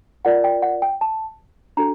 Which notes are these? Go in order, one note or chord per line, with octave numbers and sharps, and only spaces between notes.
F4 A#4 D5 F#5
G5
F#5
G5
A5
D4 F#4 A4 A#5